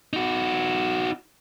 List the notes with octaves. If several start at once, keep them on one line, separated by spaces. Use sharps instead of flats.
D#4 F#4